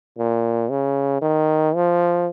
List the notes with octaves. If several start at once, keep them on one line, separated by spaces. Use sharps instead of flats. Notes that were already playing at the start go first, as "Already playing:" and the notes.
A#2
C#3
D#3
F3